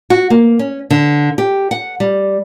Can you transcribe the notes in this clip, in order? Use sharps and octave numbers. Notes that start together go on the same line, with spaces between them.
F#4
A#3
C#4
D3
G4
F#5
G3